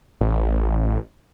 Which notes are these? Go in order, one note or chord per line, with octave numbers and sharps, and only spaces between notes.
A1